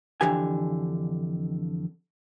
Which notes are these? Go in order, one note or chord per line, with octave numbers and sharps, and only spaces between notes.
F2 D3 E3 G4 G#5